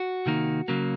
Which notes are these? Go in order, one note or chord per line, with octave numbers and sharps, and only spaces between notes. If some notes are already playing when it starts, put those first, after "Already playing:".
Already playing: F#4
C3 D#3 A#3 D#4
C#3 F#3 A#3